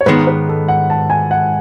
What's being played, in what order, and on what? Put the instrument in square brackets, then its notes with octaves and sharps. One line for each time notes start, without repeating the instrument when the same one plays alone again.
[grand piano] C#5
[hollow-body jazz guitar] G#2 D#3 G#3 B3 [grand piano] B4
[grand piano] B4
A4
F#5
A5
G#5
F#5